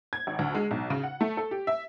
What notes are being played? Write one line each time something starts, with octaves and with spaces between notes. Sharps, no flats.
G#6
G#1
D2
G#3
B1
C#3
F#5
A3
A4
G4
E5